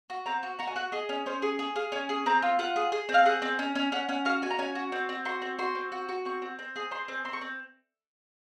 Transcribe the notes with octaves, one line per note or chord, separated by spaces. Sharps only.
F#4
C4 A#5
F#4
F#4 A#5
G#5
F#4 F#5
G#4 D#5
C#4
C#4 C5
G#4
G#4
G#4 F5
C#4 G#5
G#4
C4 A#5
F4
F4 F#5
G#4
G#4
C4
F5
G#4 F#5
C4
C#4
C#4
C#4 F#5
C#4 F#5
F#4 F5
F#4 G#5
A#5
C#4 G#5
F#4
C4
C4
F#4 C6
C4
F#4 C6
C4
F#4
F#4
C4 C#6
C4
C4
G#4
C4 C6
C4
C4 C6
C#6
C4